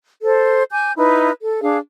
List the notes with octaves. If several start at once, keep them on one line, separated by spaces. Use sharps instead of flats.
A4 C5
G#5 D6 G6
D#4 E4 B4
A4
D4 G#4 F5